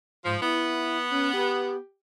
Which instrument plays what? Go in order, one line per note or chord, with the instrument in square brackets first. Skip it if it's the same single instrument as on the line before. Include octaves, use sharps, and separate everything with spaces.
[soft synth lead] G#2 [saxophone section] F3
[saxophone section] B3 [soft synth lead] E4
[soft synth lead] C#4
G4